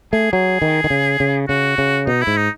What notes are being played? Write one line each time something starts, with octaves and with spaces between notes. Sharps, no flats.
A3 G#4
F#3 G#4
D#3
D#3
C#3
C#3
C#3 F#4
C#3
B2 D#4
E4
G#2
D#4